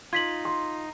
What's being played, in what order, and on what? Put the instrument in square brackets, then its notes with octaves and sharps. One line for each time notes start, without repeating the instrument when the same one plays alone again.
[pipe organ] D#4 [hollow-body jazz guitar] F4 [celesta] G#6 B6 F#7
[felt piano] C6